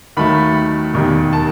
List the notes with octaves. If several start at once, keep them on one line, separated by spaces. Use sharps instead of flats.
D#2 D#3 F#3 A3 B5
E1 D#2 D#3 G3
A5